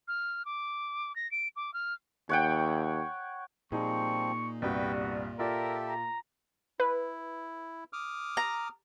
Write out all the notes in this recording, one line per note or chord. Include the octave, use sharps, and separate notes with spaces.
F6
D6
A#6
D7
D6
F6
D#2 C#5 F#5 G5
A#2 F3 G3 C4 D#4 G#4 C#6
C2 G2 G3 B3 F#4 B4 G5
B3
F4 G4 A4 A#4 D5 E5
A#5
E4 B4
D6 D#6 F6
A#5